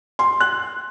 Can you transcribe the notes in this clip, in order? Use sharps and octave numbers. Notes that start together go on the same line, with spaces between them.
C6
F#6